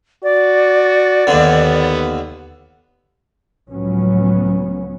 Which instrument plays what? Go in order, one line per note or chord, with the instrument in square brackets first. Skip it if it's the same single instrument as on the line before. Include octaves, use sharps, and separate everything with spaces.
[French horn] F#4 [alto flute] D5
[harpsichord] D#2 D3 [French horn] B3
[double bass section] C#2 A2 F3 F#3 B3 C#4